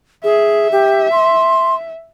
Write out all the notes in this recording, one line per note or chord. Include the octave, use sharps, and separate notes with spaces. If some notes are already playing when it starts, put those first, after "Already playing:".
G#4 E5
G4
C6